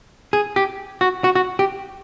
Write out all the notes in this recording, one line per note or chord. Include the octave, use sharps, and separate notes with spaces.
G#4
G4
F#4
F#4
F#4
G4